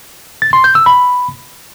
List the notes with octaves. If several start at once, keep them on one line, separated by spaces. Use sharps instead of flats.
A6
C6
G6
E6
B5